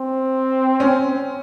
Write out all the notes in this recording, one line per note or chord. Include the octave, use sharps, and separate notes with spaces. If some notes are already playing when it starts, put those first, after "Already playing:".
Already playing: C4
C#4